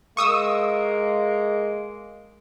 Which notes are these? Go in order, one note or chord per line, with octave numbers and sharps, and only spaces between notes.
G#3 A#3 C#6 D#6 E6